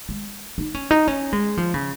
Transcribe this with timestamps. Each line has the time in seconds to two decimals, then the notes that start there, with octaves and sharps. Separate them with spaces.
0.09 G#3
0.58 D#4
0.75 C#4
0.91 D#4
1.08 C#4
1.33 G#3
1.57 F3
1.74 C#3